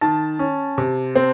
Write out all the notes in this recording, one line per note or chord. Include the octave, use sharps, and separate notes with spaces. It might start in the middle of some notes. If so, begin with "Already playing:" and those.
D#3 A5
C#4
C3
C4